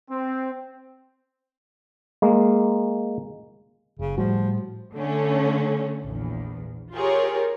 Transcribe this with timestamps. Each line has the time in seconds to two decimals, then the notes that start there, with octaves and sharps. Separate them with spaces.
0.10 C4
2.22 G#3 A#3
3.99 F#1 C#3
4.18 A2 F3 G3 F#4
4.94 D3 A3 C#4
6.04 A#1 E2
6.94 F4 G4 G#4 A#4 C#5